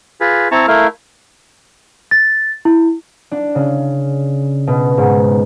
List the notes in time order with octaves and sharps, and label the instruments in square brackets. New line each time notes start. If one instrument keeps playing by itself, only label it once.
[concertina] F4 G#4 B4
C4 E4 A5 A#5 C#6
A3 E4 A#4 F5
[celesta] A6
E4
[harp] D4
C#3
B2
G#2